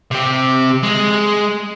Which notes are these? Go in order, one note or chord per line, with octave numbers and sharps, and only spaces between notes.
C3 G4
G#3